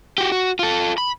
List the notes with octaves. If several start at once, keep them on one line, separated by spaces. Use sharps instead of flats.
F#4 G4
F#4
F4 A4
B5